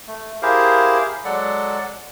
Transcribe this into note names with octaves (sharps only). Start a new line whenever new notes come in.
A3
E4 G4 G#4 A#4 C5 F5
F#3 G#3 A4 D5 F#5